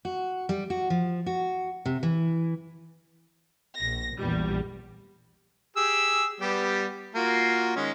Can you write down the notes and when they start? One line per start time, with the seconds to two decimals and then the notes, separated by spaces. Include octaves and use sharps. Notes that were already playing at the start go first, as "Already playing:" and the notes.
0.05 F#4
0.49 G3
0.70 F#4
0.90 F3
1.26 F#4
1.86 C3
2.03 E3
3.80 A#1 A#6
4.16 A#1 E2 G3
5.76 G4 G#4 E6
6.41 G3 B3 G4
7.15 A#3 F4 F#4
7.76 D#3 G#3 C#4